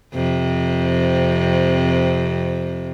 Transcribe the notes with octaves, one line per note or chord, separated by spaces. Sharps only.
F2 C3